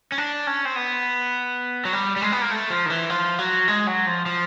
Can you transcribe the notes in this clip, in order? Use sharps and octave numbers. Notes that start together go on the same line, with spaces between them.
C#4
D4
C#4
C4
B3
F#3
G3
G3
G#3
B3
A#3
A3
F3
D#3
E3
F3
F#3
G#3
F#3
F3
F3